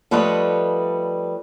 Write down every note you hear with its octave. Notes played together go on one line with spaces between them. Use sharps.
F3 G3 A3 B4 C#5 D#5